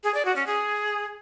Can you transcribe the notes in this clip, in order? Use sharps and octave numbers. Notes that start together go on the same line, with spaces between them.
G#4
D5
F#4
C#4
G#4